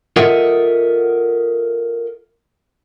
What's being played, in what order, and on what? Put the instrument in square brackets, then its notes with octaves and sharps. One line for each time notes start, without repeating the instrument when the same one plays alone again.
[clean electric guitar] F4 A4 A#4 D#5 E5 F#5